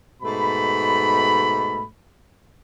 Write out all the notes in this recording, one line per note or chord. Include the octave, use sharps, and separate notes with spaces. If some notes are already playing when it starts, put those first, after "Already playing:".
G#2 B2 A3 B5